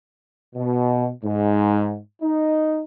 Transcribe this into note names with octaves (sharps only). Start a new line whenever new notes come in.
B2
G#2
D#4